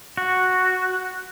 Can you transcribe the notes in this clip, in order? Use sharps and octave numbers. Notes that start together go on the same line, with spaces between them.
F#4